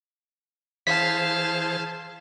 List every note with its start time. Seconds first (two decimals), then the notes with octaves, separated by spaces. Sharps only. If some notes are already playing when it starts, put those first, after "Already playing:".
0.87 E3 G#4 C5 F5 A5 B6